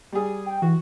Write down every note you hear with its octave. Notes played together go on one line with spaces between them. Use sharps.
G3 G#4
G5
E3 F#4